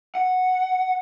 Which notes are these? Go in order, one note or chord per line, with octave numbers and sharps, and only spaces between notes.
F#5